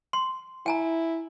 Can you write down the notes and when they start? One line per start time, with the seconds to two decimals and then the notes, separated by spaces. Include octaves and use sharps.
0.13 C6
0.66 E4 G5 G#5 A#5